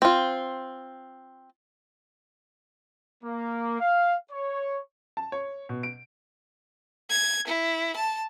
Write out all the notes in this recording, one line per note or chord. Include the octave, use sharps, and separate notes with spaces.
C4 F4
A#3
F5
C#5
A5
C#5
B2
D7
G#6
E4
A5